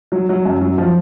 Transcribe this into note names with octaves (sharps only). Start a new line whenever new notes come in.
F#3
F#3
F#2
F#3
F3